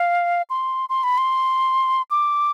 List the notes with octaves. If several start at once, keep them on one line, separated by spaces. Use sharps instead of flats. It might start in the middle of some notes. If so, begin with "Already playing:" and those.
Already playing: F5
C6
C6
B5
C6
D6